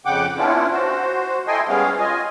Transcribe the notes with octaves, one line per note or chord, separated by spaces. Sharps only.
F2 C#3 F#5 G5 D6
B3 C#4 D4 E4 F4
F#4 C5
E4 A4 D#5 G5 G#5 C6
G3 G#3 B3 C#4 G#4 F5
F4 D#5 G#5